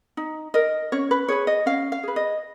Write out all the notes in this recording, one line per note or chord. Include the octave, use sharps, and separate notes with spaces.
D#4
A#4 D#5
C#4 C#5
B4
G#4 B4 C#5
D#5
C#4 F5
F5
G#4 B4
D#5